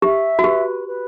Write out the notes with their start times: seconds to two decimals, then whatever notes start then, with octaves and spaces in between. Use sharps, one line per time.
0.02 G4 E5
0.39 F#4
0.44 G4 B4
0.86 B4